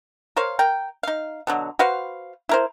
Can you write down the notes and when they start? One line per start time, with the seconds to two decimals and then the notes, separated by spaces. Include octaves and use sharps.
0.37 A#4 C5 C#5 F5
0.59 A#4 G5
1.03 D#4 F5
1.47 B2 D3 F#3
1.79 F#4 B4 C5 F5
2.49 E4 A#4 C5